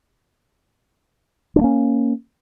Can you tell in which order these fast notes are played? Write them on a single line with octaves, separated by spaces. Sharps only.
D4 G#3 A#3 C#4